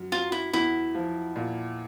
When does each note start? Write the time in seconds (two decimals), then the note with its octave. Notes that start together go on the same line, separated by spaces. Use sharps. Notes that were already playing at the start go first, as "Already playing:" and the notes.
Already playing: F#2
0.12 F#3 F4
0.32 E4
0.53 E2 E4
0.95 F3
1.36 A#2